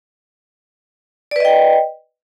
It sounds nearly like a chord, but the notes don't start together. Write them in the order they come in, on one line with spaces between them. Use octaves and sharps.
D5 B4 D#5 G5